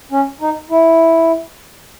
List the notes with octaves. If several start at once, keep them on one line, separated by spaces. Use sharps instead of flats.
C#4
D#4
E4